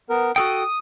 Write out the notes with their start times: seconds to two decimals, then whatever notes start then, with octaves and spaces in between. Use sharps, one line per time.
0.10 B3 A#4
0.36 F#4 A4 G5 D#6